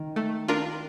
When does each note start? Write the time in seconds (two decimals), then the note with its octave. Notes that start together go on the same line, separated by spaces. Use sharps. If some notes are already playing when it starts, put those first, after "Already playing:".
Already playing: D#3
0.16 A3
0.48 D4 F4 A#4